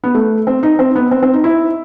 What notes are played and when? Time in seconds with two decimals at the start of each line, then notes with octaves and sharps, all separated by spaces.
0.04 B3
0.14 A3
0.47 C4
0.63 D#4
0.79 C4
0.96 B3
1.11 C4
1.23 C4
1.33 D#4
1.44 E4